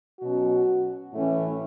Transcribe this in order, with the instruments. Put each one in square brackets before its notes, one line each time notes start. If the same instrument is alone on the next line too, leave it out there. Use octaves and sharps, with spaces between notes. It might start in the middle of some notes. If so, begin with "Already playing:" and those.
[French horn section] B2 F#3 C#4 F#4
A2 E3 A3 C#4